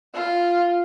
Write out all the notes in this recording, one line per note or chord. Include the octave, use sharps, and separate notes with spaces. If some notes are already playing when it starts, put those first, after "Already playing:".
F4